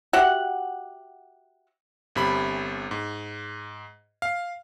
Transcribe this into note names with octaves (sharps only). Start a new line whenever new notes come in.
F#4 G4 E5 F#5
G1 C3 B5
G#2
F5